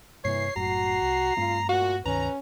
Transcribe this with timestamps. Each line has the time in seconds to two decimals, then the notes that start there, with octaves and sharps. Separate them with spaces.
0.25 G2 C3 E3 A#3 C#5 C7
0.56 F#1 F#2 A2 F#4 A#5
1.02 C2
1.37 G2 A3 C4 F4
1.69 A#2 F#4 F#5
2.06 C#2 G2 D#3 C#4 B4 A#5